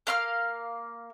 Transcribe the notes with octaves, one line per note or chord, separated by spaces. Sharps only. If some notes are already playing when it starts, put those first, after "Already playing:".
A#3 F5 C6 F6